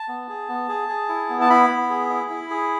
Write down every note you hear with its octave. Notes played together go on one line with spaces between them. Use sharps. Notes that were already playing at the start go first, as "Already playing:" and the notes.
Already playing: A5
B3
G#4
B3
G#4
G#4
E4
B3
A5
E4 B5
B3
G#4
E4
E4
G#4